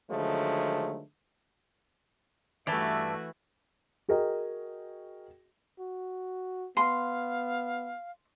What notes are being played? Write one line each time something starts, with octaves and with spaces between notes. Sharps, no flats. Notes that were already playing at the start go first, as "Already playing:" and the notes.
D3 D#3 F3 F#3 G#3 A3
G2 E3 A3 F#4 D5 E5 A5
F#4 G#4 A#4 D#5 G5
F#4
B3 F5 C6